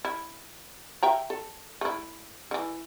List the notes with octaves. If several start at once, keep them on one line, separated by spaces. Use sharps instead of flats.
E4
E5 G5 A#5
A4
A3 E4
D3 E3